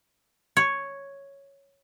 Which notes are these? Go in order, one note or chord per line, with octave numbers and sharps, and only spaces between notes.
C#5